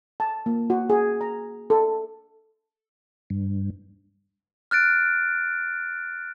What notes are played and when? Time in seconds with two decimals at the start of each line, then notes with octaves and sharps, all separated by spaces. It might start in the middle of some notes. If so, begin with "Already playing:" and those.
0.20 A5
0.46 A#3
0.70 F#4
0.90 G#4
1.21 A#5
1.70 A4
3.30 G2
4.71 F6 F#6 A6 D7